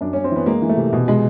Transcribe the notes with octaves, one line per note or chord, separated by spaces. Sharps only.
F#2 D4
F#2 C#4
C4
E3 B3
G#3 A#3
E3
A3
C3
B2
G#3